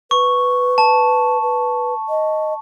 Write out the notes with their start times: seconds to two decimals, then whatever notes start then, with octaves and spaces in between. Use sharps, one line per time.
0.11 B4 C#6
0.78 A5
1.42 B4
2.09 D#5